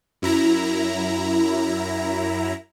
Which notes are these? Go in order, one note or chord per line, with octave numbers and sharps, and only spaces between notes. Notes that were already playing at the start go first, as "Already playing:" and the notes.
F#2 E4 A#5